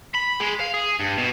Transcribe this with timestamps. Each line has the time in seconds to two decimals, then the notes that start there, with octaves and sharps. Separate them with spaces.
0.14 B5
0.40 G#3
0.60 F5
0.74 G#4
1.00 G2
1.17 B2